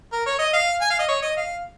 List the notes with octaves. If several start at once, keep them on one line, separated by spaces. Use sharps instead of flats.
A#4
C#5
D#5
F5
G#5
F5
D#5
C#5
D#5
F5